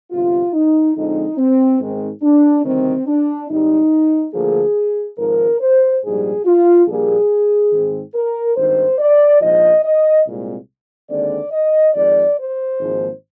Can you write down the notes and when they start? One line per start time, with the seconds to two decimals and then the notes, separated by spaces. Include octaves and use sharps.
0.11 G1 F2 C3 F4
0.53 D#4
0.95 F2 D3 F3 G#3 C4 D#4
1.38 C4
1.80 G#2 D#3 G#3 C4
2.23 D4
2.65 D2 C3 D#3 G3 C4
3.07 D4
3.49 G#1 G#2 G3 D#4
4.33 D2 D3 F3 A#3 G#4
5.18 G#1 G#2 F3 A#4
5.60 C5
6.03 A#1 G#2 G3 G#4
6.45 F4
6.87 A#1 A#2 G3 A#3 G#4
7.72 G#2 D#3 G#3 C4
8.14 A#4
8.57 G#1 G2 D#3 C5
8.98 D5
9.41 A#1 G#2 F3 D#5
9.83 D#5
10.25 C2 A#2 G#3 C4
11.10 D#2 D3 G#3 C4 D5
11.52 D#5
11.94 F2 D#3 G#3 D5
12.37 C5
12.78 G#1 G#2 F3 A#3